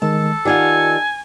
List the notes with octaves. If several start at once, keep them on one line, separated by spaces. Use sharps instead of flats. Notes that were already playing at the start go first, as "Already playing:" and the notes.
D#3 G#3 A4 A5
D#3 F4 G4 D5 F#5 G#5